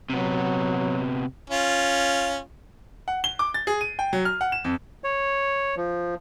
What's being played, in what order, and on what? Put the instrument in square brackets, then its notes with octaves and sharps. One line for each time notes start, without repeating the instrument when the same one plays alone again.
[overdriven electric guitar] C3 B3 [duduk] F#3
[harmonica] C#4 F4
[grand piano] F#5
G7
D6
A6
G#4
D#7
G5
F#3
F6
F#5
E7
F2
[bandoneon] C#5
F3